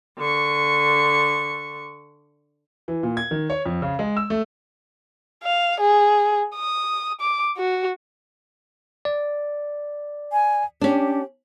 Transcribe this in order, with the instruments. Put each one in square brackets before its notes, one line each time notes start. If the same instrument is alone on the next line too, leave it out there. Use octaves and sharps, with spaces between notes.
[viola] D3 C#6
[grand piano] E3
A#2
G#6
D#3
C#5
F2
C#3
G#3
E6
A3
[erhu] F5
G#4
D#6
D6
F#4
[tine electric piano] D5
[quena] G#5
[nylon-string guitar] C#4 D4 [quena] G4